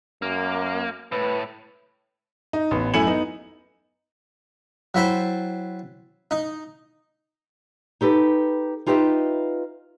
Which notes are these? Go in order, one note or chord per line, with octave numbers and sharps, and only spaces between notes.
F#2 A#3
A2 B4
D#4
A1 B3
F#2 A3 E4 G#5 C#7 F#7
B3 D#4
F#3 E4 C5 G5 A5
D#4
D#4 G4 A4 B4
D#4 F4 G4 B4 D#5 E5